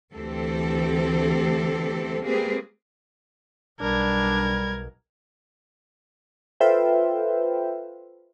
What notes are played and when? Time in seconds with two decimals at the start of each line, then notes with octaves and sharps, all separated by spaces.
0.13 D2 E3 C4 G4 A4
2.22 G#3 A#3 C4 G4 G#4 B4
3.81 B1 G3 D4 A#4 G#6
6.60 F4 A4 B4 C5 E5 G5